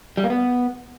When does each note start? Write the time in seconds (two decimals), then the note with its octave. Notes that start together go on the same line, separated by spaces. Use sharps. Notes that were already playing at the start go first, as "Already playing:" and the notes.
0.17 G3
0.24 A#3
0.30 B3